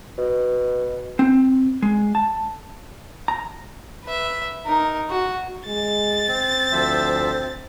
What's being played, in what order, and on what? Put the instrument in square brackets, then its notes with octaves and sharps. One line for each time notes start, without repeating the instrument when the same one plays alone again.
[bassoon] B2
[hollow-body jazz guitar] C4
G#3
A5
A#5
[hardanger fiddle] B4 E5
D#4 A#4
F#4
[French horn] G#3 [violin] A6
[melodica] C4
[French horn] D2 [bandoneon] F3 C5 E5